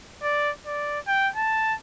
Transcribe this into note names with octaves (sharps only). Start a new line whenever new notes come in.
D5
D5
G5
A5